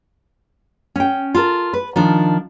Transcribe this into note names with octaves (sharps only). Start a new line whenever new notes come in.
C#4 G5
F4 A4 A#4
B4
D#3 F3 D4